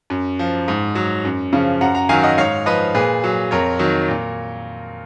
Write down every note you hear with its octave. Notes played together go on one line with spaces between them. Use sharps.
F#2
F3
G#2
F#3
F#2
C#3 F3
F#2 F#5 A#5
F#5 A#5
D#3 F#3 F5 G#5
D#5 F#5
G#2 C#5 F5
F3 B4 D#5
A#2 G#4 B4
F#3
F2 A#4 C#5
D#3 F#3
A#2